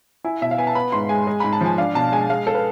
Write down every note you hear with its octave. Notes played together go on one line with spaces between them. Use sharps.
E4 G#5
B2 E5
F5
B3 G#5
A5
B3 B5
G#2 C6
G#3 G#5
G#3
G#2 B5
A5
F3 G#5
D4 F5
B2 A5
G#3 G#5
G#3 F5
A4
B4